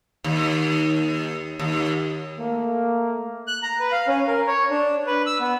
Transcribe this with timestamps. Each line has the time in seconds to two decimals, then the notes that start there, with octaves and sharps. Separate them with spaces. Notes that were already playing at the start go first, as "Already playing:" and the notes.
0.24 D#2
1.59 D#2
2.38 A3 A#3
3.48 F#6
3.63 A#5
3.80 B4
3.92 F5
4.08 C#4
4.27 A#4
4.47 C#5
4.70 D4
5.07 B4
5.26 E6
5.40 B3